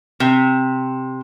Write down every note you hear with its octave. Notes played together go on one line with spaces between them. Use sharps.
C3